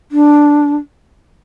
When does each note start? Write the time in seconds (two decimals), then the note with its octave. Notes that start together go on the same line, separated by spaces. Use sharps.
0.12 D4